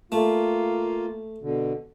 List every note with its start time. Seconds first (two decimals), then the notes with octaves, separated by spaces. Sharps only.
0.12 A3 A#3 F4
1.42 B2 D3